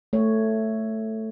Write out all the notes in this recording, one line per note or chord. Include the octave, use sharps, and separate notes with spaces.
A3 C#5